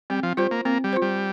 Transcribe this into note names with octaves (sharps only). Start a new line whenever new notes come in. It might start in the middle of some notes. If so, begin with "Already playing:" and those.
G3 C4
F3
G3 F4 C5
A#3
A#3 C4
G3
F4 C5
G3